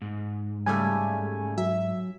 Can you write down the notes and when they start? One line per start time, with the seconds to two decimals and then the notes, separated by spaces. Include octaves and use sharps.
0.02 G#2
0.66 C#3 G3 A3 G#5
1.58 F#3 E5